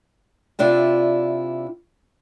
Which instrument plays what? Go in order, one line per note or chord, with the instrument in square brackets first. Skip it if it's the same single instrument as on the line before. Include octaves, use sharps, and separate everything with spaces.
[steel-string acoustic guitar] C3 D4 E4 F4